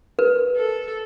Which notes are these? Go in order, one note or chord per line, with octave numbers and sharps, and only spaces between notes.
A#4 B4
A4